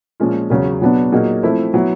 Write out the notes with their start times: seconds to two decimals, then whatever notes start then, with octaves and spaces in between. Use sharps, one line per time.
0.20 A#2 F3 G#3 C#4 F4
0.50 E2 C#3 F#3
0.81 B2 F#3 B3 D4 F#4
1.12 A#2 F#3 A#3 D#4 G#4
1.43 F3 A3 C4 E4
1.74 F#3 B3 E4